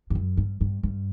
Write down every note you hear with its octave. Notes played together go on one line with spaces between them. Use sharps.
G2
F#2
G2
G2
G2